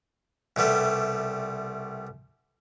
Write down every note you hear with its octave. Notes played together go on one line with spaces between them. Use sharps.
C2 B2 G3 A3